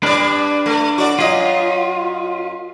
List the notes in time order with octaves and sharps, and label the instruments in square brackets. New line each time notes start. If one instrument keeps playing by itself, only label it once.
[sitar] G3 D5 [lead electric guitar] D4 B4
[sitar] A3
F#4 D5
[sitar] F#2 D#5 [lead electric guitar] F4